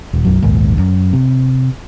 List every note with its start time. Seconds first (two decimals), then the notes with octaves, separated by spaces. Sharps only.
0.13 D#1
0.25 B1 F#2 F#3
0.42 A#1 D#2 G#2
0.78 F#2
1.13 C3